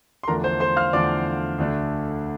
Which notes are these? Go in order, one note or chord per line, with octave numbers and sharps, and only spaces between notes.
C6
E2 D3 F3 A3 D4 A#4 A#5
C5 C6
C5 C6
F5 F6
E2 D3 F3 A3 D4 D5 D6
D2 D3 A3 D4